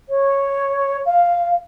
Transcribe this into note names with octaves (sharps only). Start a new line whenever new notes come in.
C#5
F5